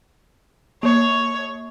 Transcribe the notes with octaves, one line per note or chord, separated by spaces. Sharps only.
A#3 C#5